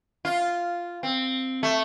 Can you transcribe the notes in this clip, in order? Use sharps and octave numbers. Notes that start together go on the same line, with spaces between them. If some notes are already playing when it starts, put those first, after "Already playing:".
F4
C4
A3